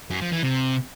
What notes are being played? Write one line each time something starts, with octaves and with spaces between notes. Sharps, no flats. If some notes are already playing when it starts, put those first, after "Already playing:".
F#2
F3
E3
C3